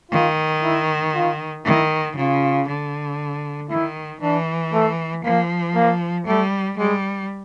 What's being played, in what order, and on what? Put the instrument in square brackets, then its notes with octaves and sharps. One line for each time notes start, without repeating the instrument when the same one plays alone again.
[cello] D#3 [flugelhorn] F4
[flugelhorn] E4
F4
[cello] D#3 [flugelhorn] E4
[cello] C#3 [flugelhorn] F4
[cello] D3
[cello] D#3 [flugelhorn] E4
[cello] E3 [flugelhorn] D4
[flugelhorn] A3
[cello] F3 [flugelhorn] A#3
[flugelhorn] A#3
[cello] G3 [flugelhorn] A3
[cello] G3 [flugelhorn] G#3